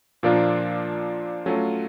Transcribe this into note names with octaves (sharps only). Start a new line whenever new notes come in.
A#2 F3 A#3 D4 F4
F#3 A3 C#4 F4